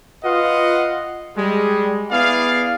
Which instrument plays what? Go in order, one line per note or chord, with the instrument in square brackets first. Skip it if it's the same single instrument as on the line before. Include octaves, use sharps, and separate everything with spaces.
[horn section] F4 B4 D#5 F5 F#5
G3 G#3
B3 E4 G#4 D5 F5